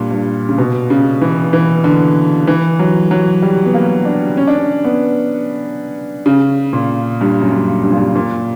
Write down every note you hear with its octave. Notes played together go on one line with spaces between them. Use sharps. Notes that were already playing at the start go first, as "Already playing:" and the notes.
Already playing: G2 A#2
G2
C#3
B2
C#3
E3
E3
D3
E3
F#3
F#3
G3
B3
A#3
D4
C#4
D4
C#4
B3
C#3
A#2
G2
F#2
G2
G2
A#2
G2
A#2